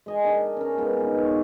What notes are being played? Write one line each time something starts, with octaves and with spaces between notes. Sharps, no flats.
G#3 D#5 G#5
D4 A#4
C#4 A#4
G#3 B3 D#4 F4
D#3
C#5